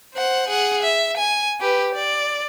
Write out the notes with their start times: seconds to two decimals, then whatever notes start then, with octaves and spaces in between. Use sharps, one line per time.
0.14 C5 F#5
0.48 G#4 F#5
0.83 E5
1.17 G#5
1.60 G4 B4
1.95 D5